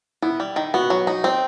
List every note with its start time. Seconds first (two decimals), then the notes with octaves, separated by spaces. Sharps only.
0.22 B3 E4
0.40 G3
0.56 D#3
0.74 B3 F#4
0.90 F#3
1.07 D#4
1.24 C4 C5